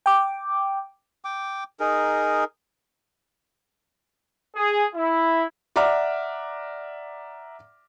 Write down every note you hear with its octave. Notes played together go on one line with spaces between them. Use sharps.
G5 D6
G5 D6
D#4 G#4 A#4
G#4
E4
D5 E5 F#5 A#5 D6 F6